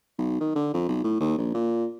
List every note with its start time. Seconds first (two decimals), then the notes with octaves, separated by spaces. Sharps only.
0.18 B1
0.40 D#3
0.55 D3
0.74 F2
0.88 B1
1.04 A2
1.20 D#2
1.38 A#1
1.54 A#2